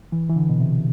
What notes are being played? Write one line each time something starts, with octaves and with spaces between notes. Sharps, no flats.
E3
E3
D3
B2
C3